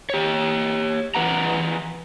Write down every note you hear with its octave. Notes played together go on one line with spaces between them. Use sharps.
G4 C#5
E3 B4 F#5 A#5